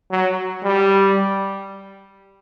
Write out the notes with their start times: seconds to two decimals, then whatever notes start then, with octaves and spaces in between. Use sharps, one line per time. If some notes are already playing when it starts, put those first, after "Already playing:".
0.11 F#3
0.64 G3